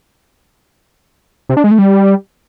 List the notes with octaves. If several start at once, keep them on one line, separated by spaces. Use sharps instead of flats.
C3
D4
G#3
A3
G3